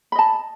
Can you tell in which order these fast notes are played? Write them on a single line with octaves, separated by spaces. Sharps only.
B5 D#5 A5